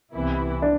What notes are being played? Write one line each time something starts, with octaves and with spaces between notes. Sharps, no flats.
C2 C3 E3 B3 E4
D4